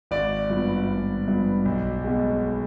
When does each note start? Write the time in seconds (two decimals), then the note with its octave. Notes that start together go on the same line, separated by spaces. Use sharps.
0.11 G#1 D5
0.50 G2 F3 B3
0.88 G#1
1.28 G2 F3 B3
1.65 B1
2.04 B2 G#3